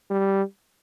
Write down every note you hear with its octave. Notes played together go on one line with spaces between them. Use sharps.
G3